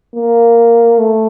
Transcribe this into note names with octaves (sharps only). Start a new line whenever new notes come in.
A#3
A3